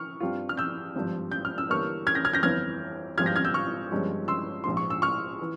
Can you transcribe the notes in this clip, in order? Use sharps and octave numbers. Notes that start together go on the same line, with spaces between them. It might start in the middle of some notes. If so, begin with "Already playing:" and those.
Already playing: C#6 F6
G2 G3 C4 F4
F6
E6 G6
G#1 G2 F3
G6
F6
E6
G1 G2 E3 A#3 C#6 F6
F6 G#6
G6 A#6
F6 G#6
G6 A#6
G1 F2 E3 F6 G#6
G#1 G2 F3 C4 F4 F6 G#6
G6 A#6
F6 G#6
E6 G6
C#6 F6
G1 G2 F3 G#3 C#4
C6 E6
A#1 G#2 F3 C6
C#6
E6
C#6 F6
E3